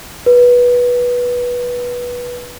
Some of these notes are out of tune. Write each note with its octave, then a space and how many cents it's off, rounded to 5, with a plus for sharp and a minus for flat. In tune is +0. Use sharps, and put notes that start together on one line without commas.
B4 -15